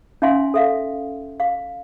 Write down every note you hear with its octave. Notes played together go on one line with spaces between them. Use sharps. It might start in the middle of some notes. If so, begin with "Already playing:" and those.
C#4 D#4 E5 F5 G#5 C6
A4 E5 F5
F5